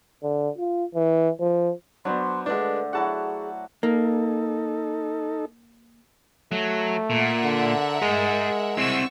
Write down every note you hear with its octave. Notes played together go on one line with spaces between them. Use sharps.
D3
F4
E3
F3
F#3 B3 D4 C5 C6
D3 G#3 A3 D4 B4
F#3 E4 F#4 G#4 F#5 A5
A#3 D#4 A4
F#3 A3
A#2 A#4 E5 F#5
D3
G#3 G#4 A#5
C4 E4 F#5 C#6 E6